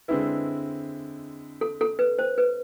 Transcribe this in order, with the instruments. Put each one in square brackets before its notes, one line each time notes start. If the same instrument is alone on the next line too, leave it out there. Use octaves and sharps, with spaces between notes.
[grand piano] D3 G#3 C4 E4 [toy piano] B4
[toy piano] A4
A4
B4
C5
B4